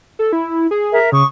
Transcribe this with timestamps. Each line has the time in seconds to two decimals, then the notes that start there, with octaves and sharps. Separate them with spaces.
0.19 A4
0.33 E4
0.71 G#4
0.92 A#4 E5
1.12 C#3 C#6 D#6